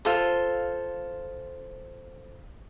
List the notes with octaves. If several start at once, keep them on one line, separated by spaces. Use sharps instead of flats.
F4 A4 C5